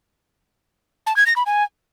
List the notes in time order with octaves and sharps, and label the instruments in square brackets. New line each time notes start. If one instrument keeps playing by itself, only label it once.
[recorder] A5
G#6
A#6
B5
G#5